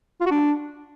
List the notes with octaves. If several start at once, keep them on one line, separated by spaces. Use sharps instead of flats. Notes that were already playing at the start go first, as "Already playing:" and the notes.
F4
F#4
D4